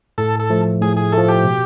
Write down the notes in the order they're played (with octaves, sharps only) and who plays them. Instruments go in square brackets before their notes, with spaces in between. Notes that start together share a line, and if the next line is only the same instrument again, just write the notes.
[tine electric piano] A2 [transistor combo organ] A4
[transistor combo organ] A4
[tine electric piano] F3 A3
[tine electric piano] A2 [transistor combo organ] G#4
[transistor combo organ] G#4
[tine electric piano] F3 A3 [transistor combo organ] A4
[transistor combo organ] G4
[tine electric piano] B2